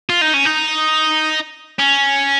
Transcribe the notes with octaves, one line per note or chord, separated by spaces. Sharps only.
F4
D#4
C#4
D#4
C#4